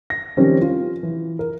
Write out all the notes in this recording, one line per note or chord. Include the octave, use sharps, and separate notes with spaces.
A#6
D#3 F3 G3 C4 C#4
F4
E3
A#4